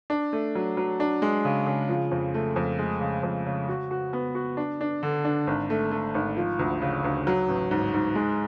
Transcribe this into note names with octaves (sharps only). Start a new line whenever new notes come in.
D4
A3
F#3
F#3
D4
G#3
C#3
C#3
F3
F2
A3
F2
G#3
C#3
F2
C#3
F#4
F#4
B3
F#4
D4
D4
D3
D4
G#1
A3
A3
G#1
F3
D2
C#3
D2
F#3
A1
G#2
G#2
G#3